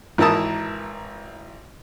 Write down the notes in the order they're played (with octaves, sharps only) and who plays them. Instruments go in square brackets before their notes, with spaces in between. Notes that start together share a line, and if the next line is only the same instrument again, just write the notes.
[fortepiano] G#1 E3 E4 A#4 A5 D#6